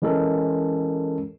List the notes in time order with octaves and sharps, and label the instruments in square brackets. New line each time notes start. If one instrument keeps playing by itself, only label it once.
[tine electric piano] E3 G#3 C#4 A4 A#4